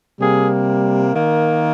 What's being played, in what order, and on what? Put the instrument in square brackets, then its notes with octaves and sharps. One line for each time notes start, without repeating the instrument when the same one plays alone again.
[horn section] C3 G3 A#3 G#4
D#3 A#3